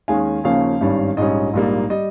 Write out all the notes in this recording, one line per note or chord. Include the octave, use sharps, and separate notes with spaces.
D#2 D#3 G#3 C#4 F5 G#5
D#2 C#3 F3 A#3 C#4 F5
G#1 G2 D#3 G3 C#4
A#1 G#2 G3 C#4 D#5
A#1 G#2 G3 A#3
G3 D#5